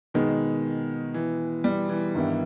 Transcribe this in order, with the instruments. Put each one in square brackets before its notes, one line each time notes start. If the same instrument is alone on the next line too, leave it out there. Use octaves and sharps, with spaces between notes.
[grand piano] B2 G#3 B3 [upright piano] D#3
[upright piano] E3
G3
E3
[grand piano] G2 D#3 G3 B3 E4